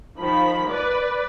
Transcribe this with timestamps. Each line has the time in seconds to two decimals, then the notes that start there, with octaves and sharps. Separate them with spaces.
0.17 D#3 F3 B5
0.70 B4 D5